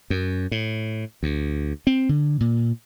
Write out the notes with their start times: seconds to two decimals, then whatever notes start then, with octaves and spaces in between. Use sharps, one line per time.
0.10 F#2
0.51 A2
1.23 D2
1.87 C4
2.09 D3
2.40 A#2